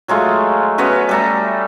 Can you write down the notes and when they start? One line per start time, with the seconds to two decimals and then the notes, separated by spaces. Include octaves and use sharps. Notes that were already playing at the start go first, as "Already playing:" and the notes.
0.08 F#3 G#3 A3 F4
0.78 B3 C#4 F#4 B4
1.09 G3 A3 A#5